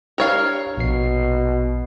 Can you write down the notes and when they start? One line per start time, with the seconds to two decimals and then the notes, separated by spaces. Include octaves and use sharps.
0.18 D4 G4 A#4 C#5 F5
0.77 A#1 B2 C7